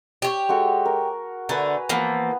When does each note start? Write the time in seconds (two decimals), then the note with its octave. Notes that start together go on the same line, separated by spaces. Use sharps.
0.22 G4 C#5
0.49 G#3 F#4 A4
0.85 A#4
1.49 D3 A3 B4 G#5 A#5
1.89 E3 F3 A#3 B3 F5